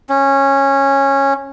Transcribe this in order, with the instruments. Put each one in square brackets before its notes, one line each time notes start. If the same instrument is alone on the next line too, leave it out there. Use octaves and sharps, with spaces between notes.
[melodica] C#4